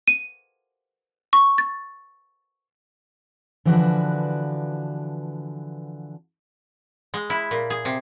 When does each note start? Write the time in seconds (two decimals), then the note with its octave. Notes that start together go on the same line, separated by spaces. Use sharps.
0.08 D#7
1.33 C#6
1.58 A6
3.65 D3 E3 F3 D4 F#4 B4
7.14 G#3
7.30 E4
7.51 A#2
7.70 G#4
7.85 C3